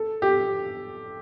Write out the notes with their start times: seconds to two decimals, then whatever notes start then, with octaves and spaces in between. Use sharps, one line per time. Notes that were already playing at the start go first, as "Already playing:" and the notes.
Already playing: A4
0.22 G4